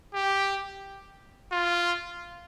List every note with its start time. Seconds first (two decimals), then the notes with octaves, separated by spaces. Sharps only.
0.14 G4
1.52 F4